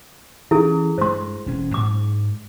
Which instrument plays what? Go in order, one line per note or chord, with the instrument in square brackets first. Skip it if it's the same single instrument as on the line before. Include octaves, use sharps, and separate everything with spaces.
[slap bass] E3 C#4 [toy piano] E4 G#4 A4
[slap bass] G2 G#3 [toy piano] C5 C6
[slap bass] E1 C#4
[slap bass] G#2 [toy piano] D6